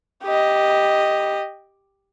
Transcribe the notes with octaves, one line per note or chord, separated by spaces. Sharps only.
G4 D#5